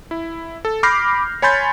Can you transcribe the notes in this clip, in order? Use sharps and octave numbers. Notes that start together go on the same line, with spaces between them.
E4
A4
B5 D6 F6 G6 A#6 C7
C#5 G#5 B5 C6 G6 A6